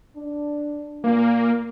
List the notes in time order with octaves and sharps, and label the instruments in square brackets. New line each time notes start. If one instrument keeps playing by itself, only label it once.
[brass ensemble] D4
[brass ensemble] A#2 [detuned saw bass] A#3